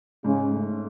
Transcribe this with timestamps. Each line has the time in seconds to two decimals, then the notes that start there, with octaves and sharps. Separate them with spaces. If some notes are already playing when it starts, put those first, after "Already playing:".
0.24 G#2 C#3
0.52 A3